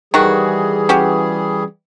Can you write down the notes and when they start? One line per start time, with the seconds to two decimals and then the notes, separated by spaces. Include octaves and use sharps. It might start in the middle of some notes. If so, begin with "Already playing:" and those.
0.14 D#3 E3 G3 F#4 G#4
0.89 C#4 F#4 G4